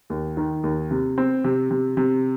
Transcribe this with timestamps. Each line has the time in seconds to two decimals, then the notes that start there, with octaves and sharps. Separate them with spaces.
0.10 D#2
0.37 D#3
0.63 D#2
0.91 C3
1.18 C4
1.44 C3
1.71 C3
1.97 C3